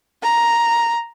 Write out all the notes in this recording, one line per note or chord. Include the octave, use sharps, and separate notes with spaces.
A#5